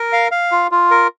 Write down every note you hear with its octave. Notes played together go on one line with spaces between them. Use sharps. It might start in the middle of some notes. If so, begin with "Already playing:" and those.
Already playing: A#4
F5
F5
F4
F4
A#4